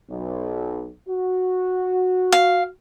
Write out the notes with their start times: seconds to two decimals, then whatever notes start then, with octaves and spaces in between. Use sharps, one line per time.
0.10 B1
1.08 F#4
2.32 F5